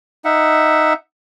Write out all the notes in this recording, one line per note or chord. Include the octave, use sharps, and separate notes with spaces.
D#4 E5 F#5